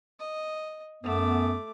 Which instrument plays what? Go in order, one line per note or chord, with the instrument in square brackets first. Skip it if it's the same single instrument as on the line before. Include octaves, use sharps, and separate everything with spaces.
[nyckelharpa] D#5
[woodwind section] F#2 B3 [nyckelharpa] A3 D6